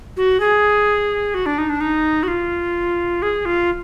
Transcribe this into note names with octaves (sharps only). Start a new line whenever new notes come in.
F#4
G#4
F#4
D4
D#4
D4
D#4
F#4
F4
G#4
F4